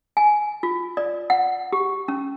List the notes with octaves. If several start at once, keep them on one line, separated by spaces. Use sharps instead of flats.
G#5
F4
D5
F#5
G4
C#4